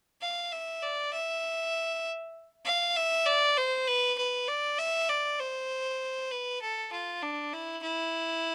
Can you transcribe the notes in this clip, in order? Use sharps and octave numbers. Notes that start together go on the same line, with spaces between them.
F5
E5
D5
E5
F5
E5
D5
C5
B4
B4
D5
E5
D5
C5
B4
A4
F4
D4
E4
E4